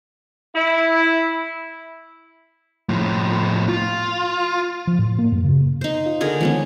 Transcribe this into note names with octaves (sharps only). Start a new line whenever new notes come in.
E4
A2 F3
F4
F3
A2
A#3
F#2
C#3
D#4 C5
F4
D3 G#4 A#4
D#3 F3 G#3 B3 C#4